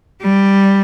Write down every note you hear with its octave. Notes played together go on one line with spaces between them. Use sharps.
G3